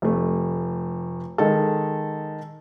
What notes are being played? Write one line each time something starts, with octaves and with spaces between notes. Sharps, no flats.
F1 A3
D#3 G#3 A4